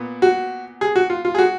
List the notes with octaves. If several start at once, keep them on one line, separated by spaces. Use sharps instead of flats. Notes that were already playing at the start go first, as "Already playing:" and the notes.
Already playing: A#2 B3
F#4
G#4
F#4
F4
F4
G#4
F#4